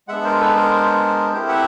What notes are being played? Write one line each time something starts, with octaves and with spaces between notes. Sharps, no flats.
G#3 B3 D4 E5 F#5
A#4 C5
A4 B4
A#4 C5
A3 C4 E4 G4 A#4 C5
E5 F#5